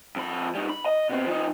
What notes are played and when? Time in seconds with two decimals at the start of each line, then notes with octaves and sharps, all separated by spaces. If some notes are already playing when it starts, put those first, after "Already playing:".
0.16 F2 B5
0.55 G3 D#4
0.70 B5
0.86 D#5
1.09 B2 C4
1.26 F3 D#4